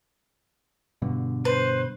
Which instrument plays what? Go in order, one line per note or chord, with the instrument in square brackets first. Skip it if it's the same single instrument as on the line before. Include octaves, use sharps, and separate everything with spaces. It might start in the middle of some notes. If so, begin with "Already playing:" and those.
[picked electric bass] G2 B2 D3
[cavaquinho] B4 [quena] C5